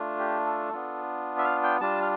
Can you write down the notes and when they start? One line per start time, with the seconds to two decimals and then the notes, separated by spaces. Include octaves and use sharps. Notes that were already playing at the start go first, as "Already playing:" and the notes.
Already playing: A3 D4 F4
0.19 G4
0.46 A4
0.73 B3 D4 F4
1.38 E5
1.44 F5
1.64 G5
1.80 G3 D4 F4 A5
2.01 F5